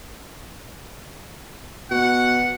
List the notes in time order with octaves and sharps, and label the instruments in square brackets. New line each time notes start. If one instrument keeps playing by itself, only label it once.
[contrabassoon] B2 [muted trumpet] F#5